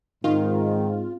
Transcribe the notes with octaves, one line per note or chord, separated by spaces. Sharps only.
G#2 D#3 C4 F4